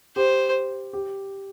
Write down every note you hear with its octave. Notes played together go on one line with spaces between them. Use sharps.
G4 C5
G4